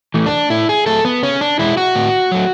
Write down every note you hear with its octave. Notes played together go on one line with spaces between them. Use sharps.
E3 A3
D4
A2 E4
G#4
F#3 A3 A4
B3
C#3 C#4
D4
E3 G#3 E4
F#4
A2
F#3 A3